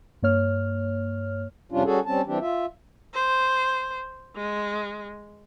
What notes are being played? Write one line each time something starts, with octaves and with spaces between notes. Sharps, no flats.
G2 A#3 C#5 F6
F2 C3 G3 C#4 D4 F4
G3 C#4 F#4 G#4 A4
G3 C4 C#4 A5
E3 G3 C4 D4 G4
F4 E5
C5
G#3